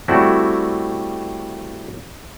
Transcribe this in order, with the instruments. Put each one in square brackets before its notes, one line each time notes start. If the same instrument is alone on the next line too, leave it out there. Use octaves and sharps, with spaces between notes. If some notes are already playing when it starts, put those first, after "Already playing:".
[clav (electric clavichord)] G3 A3 C4 E4 F#4